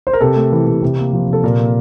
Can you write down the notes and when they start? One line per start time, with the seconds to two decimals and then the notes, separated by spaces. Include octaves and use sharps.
0.07 C5
0.13 A#4
0.21 C3 A4
0.36 A3
0.52 E3
0.67 C3
0.82 C3
0.98 A#3
1.13 F3
1.28 C3 A4
1.44 A#2 A#4
1.59 A#3